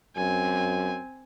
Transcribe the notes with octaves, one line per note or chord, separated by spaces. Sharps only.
F#2 C4 G#5